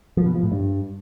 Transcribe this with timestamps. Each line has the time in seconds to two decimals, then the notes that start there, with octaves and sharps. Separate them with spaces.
0.17 F3
0.26 B2
0.34 F3
0.43 A2
0.52 G2